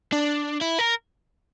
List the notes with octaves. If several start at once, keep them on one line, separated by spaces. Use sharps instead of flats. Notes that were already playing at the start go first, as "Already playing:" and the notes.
D4
E4
A#4